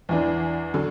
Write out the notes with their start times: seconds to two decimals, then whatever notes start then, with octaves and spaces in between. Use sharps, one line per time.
0.09 E2 E3 D4
0.74 D3 F#3